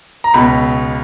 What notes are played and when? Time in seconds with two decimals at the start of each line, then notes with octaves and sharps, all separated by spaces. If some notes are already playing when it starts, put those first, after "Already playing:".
0.24 A#5
0.34 C#2 B2 B5